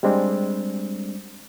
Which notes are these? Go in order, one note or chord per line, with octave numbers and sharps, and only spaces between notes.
G3 G#3 C4 D4